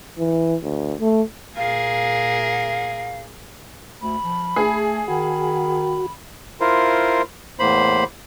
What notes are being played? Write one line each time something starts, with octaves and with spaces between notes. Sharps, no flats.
E3
D2
A3
A#2 G#4 A#4 F5
D2 B5
F3
A3 G#4
D#3 F#4 B5
E4 F4 A#4 C5
E2 A2 A#3 C5 B5